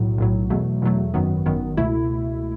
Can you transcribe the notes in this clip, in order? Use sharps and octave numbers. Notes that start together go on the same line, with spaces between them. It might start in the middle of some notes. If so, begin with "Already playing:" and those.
Already playing: B1 A2 F#3
B1 A2 F#3
E2 B2 F#3 A3
E2 B2 F#3 A3
G#1 F#2 D#3 F#3 B3
G#1 F#2 D#3 F#3 B3
C#2 B2 A3 E4